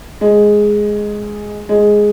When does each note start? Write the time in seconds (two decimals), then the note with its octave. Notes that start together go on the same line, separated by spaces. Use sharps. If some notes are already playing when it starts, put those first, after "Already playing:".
0.21 G#3
1.69 G#3